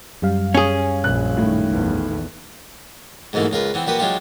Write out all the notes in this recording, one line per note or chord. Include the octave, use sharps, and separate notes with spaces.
F#2 G3 F5
C#4 G#4
A#1 F#6
A2 D#3
A#1 E2
G#2 B2 E3 A3 A#3
C#2 F4 A#4 B4
E3 B3 C4
A#2 F#4 G4 B4 D#6
F#3 G#3 D4 F4 G4